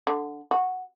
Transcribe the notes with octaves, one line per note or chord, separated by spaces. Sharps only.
D3
F#4